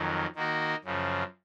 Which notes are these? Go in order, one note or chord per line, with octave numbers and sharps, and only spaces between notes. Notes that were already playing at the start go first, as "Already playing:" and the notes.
Already playing: F2 D#3 F#3
D#3 A#3 D#4 F#4 A#4
F#2 C#3 F3